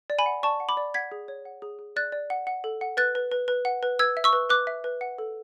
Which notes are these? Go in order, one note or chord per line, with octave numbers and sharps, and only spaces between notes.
D5
G#5 B5
F#5
D5 A5 C#6
F#5
B5 D6
D5
F#5 G#6 B6
G#4
C#5
F#5
G#4
G#4
D5 F#6 A6
D5
F#5
F#5
A4
F#5
B4 F#6 A6
B4
B4
B4
F#5
B4
B4 E6 G#6
E5
C#6 E6
B4
B4 D6 F#6
E5
B4
F#5
A4